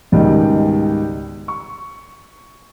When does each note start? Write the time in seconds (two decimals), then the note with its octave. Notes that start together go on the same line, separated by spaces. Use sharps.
0.12 C#2 G#2 B2 D#3 G3
1.48 C#6